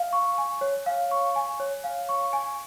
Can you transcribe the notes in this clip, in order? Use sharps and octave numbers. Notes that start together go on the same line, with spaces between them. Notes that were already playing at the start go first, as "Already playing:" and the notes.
Already playing: F5
C#6
G#5
C#5
F5
C#6
G#5
C#5
F5
C#6
G#5